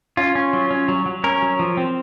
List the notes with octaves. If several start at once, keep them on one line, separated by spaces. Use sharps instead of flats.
C#4 F4
C#4
F#3
C#4
F#3
F#3
C#4 A#4
F#3
F3
C4